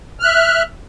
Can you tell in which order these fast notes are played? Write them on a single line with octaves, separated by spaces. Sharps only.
F6 F#6 E5